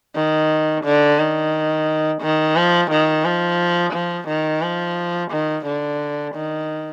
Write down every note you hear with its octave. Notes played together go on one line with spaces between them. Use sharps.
D#3
D3
D#3
D#3
F3
D#3
F3
F3
D#3
F3
D#3
D3
D#3